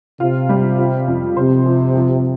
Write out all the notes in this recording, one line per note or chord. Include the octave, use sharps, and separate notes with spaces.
C3 F4
G3
F4
F2
C3 C5
F3
F3